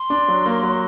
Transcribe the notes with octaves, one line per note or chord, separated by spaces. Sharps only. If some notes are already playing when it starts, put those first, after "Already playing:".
Already playing: C6
D4
F#3
A#3
F#3